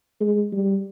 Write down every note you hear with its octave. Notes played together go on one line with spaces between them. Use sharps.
G#3
G3